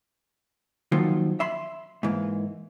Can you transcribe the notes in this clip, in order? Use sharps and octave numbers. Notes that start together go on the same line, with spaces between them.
D#3 F3 F#3 A#3 D#4 F4
E5 B5 C6
G#2 E3 A#3